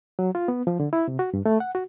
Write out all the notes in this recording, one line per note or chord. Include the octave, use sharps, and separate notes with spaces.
F#3
F4
B3
F3
D3
E4
C3
F#4
G2
A3
F#5
F#4